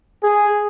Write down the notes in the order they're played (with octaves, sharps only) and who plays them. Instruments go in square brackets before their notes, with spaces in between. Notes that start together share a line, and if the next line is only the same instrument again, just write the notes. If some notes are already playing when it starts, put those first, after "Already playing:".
[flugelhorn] G#4